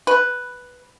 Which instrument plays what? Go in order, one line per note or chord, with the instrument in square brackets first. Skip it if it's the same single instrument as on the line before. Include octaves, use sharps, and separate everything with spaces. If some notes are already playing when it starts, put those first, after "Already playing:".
[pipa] B4